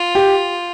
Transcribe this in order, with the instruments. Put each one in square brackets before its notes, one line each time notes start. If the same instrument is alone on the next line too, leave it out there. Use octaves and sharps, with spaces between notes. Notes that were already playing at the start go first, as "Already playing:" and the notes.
Already playing: [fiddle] F4
[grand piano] G4